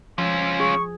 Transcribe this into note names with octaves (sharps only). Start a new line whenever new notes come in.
F3 C#4 F4
G#4 C#6